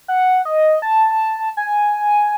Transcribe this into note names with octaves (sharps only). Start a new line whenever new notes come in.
F#5
D#5
A5
G#5